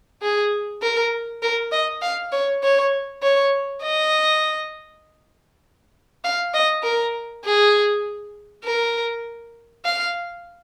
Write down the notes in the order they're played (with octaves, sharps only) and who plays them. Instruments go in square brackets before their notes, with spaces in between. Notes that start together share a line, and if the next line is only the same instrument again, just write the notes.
[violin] G#4
A#4
A#4
D#5
F5
C#5
C#5
C#5
D#5
F5
D#5
A#4
G#4
A#4
F5